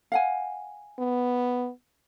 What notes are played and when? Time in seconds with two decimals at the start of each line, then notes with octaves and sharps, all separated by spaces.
0.12 F5 F#5 G#5
0.99 B3